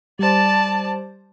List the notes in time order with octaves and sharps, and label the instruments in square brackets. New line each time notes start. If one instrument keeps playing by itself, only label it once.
[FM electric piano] G3 C5 [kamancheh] D5 A5